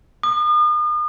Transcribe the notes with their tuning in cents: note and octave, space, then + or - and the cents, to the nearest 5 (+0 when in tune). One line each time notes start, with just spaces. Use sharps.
D#6 -40